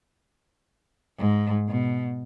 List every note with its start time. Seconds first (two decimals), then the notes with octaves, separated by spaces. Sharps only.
1.18 G#2
1.68 B2